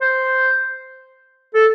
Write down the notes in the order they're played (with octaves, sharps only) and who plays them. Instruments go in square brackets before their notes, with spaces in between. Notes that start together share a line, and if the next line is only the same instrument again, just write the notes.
[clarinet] C5
A4